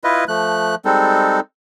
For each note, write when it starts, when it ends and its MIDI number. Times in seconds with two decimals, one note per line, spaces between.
0.04 0.24 64
0.04 0.24 65
0.04 0.24 71
0.04 0.24 75
0.28 0.75 53
0.28 0.75 57
0.28 0.75 90
0.85 1.40 55
0.85 1.40 56
0.85 1.40 60
0.85 1.40 63
0.85 1.40 69